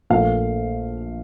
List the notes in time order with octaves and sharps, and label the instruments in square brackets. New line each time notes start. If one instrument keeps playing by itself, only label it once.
[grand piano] A#1 A#2 A3 F5